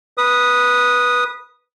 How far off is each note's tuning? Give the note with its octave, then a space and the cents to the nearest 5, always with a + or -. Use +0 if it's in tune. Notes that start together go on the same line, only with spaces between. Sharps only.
B4 -15 D#6 -5